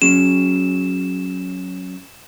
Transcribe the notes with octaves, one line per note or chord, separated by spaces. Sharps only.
F#3 C#4 G#4 E7